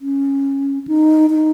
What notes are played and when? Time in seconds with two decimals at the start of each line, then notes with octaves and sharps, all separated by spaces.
0.01 C#4
0.87 D#4
1.30 D#4